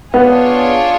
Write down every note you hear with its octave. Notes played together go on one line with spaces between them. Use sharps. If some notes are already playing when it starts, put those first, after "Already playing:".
B3 D4 F4 G#4 C#5